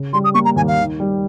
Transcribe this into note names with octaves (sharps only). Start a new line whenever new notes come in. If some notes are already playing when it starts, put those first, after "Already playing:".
Already playing: C#3
G3 C6
D#6
A#3 C#6
A#5
D#2 G#5
F5
D#3
G3